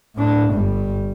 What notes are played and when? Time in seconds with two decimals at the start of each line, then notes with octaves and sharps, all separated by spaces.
0.16 A2 D4
0.53 G1 G3